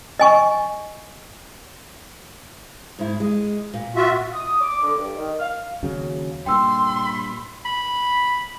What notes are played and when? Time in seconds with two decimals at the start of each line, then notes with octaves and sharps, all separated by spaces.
0.19 D#5 G#5 C#6
2.99 G#2 E4
3.20 G#3
3.74 A#2
3.96 F4 F#4 E5
4.33 D#6
4.61 D6
4.83 D3
4.98 G2
5.17 D#3
5.39 F5
5.83 D#2 C#3 F#3
6.46 G2 A#2 G5 C6 E6
7.65 B5